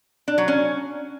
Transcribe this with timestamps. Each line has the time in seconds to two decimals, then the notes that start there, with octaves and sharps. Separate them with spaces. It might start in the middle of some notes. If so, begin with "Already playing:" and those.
0.28 D4
0.38 F#3
0.48 C#4